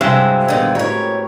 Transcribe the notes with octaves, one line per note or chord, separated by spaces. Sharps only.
G2 C3 F#3 G#3 E4 C5 F5 G5
A#2 D3 D#3 G3 B3
A2 F#4 G4 A#4 B4 C#5